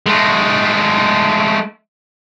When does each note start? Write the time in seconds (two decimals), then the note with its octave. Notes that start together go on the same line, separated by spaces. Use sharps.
0.06 G#3 A3